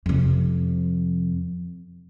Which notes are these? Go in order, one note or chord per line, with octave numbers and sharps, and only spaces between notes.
F2 C3